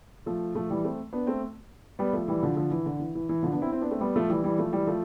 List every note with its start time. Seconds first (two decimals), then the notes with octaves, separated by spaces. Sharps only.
0.26 F3 A3
0.55 F3 A3
0.70 E3 G3
0.85 A3 C4
1.13 B3 D4
1.27 A3 C4
1.99 G3 B3
2.13 F3 A3
2.28 E3 G3
2.43 D3 F3
2.56 D3 F3
2.71 E3
2.86 D3
3.00 E3
3.15 E3
3.29 E3
3.43 D3 F3
3.53 B3 D4
3.62 C4 E4
3.72 C4 E4
3.81 B3 D4
3.91 A3 C4
4.01 G3 B3
4.16 F3 A3
4.29 E3 G3
4.44 E3 G3
4.58 F3 A3
4.72 E3 G3
4.87 F3 A3